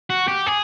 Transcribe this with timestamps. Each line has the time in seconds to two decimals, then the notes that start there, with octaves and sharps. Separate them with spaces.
0.10 F#4
0.28 G4
0.46 G#4